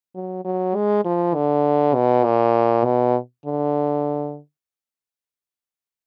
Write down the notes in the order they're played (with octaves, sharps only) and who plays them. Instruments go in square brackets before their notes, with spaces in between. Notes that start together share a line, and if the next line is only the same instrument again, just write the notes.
[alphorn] F#3
F#3
G#3
F3
D3
B2
A#2
B2
D3